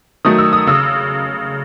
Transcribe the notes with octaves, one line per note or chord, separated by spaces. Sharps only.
D#3 F#3 A3 D#6
E6
D#6
C#3 E6